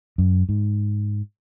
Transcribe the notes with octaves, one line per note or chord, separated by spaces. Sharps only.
F#2
G#2